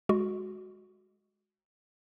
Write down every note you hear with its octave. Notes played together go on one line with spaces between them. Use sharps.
G#3 F#4